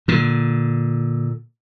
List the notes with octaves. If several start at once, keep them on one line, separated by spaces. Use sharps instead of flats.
A#2 D3